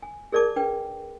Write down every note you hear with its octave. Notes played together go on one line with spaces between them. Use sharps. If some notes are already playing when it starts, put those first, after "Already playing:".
G#5
G#4 A#4 D5 A5 D6
D4 B4 G5